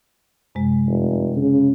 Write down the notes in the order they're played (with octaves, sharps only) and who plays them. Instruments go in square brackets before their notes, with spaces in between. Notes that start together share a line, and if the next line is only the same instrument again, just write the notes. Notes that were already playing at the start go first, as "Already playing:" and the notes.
[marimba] F#2 C3 G#3
[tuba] F1
C#3